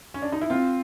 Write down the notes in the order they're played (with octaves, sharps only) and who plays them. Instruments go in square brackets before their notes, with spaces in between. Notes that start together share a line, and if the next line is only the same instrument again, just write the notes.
[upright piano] C#4
D4
D#4
E4
[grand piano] C4 [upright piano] F4